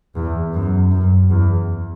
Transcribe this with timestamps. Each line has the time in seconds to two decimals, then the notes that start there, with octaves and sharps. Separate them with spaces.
0.15 E2
0.53 F#2
0.92 F#2
1.30 E2